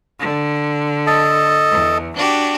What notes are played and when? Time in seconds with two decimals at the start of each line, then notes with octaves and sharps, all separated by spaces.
0.19 D3
1.07 A4 D#5 A5
1.70 E2
2.16 D4 F#4 G4